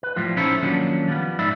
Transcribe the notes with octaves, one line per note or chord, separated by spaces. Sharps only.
B4
A2 F3 G3 F4
C#4 D#4 E4 A4 C5 C#5
D#3 F3 F#3 A#3 C#4 D4
F3 G3 B3
G#2 D#4 D5 E5 B5